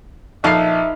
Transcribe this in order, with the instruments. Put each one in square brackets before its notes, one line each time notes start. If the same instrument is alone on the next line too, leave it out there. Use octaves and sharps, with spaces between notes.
[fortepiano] A#1 [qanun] D#4 A4 B4 [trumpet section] E5 [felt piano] A5 F6 C7